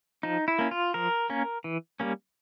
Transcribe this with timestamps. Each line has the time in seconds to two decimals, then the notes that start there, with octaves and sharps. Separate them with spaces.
0.23 F3 D#4
0.48 E4
0.59 A#3 C#4
0.71 F4
0.94 F3 A#4
1.30 A#3 C#4
1.64 E3
2.00 G3 A#3 C#4